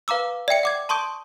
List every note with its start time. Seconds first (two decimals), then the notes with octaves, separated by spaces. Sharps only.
0.08 B4 F5 A#5 D6 E6
0.48 D5 E5 G5 C#7
0.63 F#5 D6 G#6
0.89 A5 C6 C#6 D#6 G6 D7